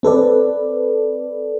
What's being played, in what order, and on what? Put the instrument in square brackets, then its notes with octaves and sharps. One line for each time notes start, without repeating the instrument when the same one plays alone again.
[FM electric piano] C4 A4 B4 D5